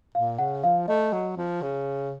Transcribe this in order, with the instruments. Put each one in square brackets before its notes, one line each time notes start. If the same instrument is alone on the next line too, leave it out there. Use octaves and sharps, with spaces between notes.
[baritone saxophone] A#2 [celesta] F5
[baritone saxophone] C#3 [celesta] F#5
[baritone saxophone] F3 [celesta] F5
[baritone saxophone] A3 [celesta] D#5
[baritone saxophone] F#3
F3
C#3